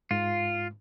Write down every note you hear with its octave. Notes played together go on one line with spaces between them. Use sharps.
G#2 F4